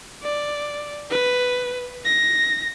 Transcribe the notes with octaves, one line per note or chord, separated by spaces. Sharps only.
D5
B4
A#6